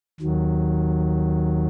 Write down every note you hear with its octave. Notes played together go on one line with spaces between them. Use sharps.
D#2 D#3 F#3